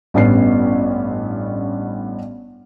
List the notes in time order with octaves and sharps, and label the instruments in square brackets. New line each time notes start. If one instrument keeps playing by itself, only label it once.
[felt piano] A1 G2 B3 C#4 C7